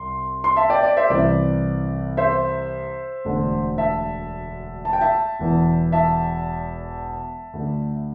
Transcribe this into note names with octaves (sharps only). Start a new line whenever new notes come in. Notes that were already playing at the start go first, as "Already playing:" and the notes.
Already playing: C2 C6
C6
E5 A5
D5 G5
D5
C5 E5
C2 C3 E3 D5
C5 E5
E1 D2 D3
E5 A5
A5
G5
E5 A5
E1 E2 E3
E5 A5
D2 D3